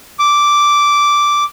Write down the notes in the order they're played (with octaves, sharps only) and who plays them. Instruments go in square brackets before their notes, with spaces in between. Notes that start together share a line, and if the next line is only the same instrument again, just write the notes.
[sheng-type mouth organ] D6